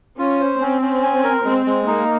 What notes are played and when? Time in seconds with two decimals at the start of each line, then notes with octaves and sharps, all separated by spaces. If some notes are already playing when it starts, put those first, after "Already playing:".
0.18 C#4 F4
0.40 C5
0.60 C4 C#4
0.82 C#4
1.03 G#5
1.24 A#4
1.44 G#3 C4
1.66 G#3
1.86 A#3 D#4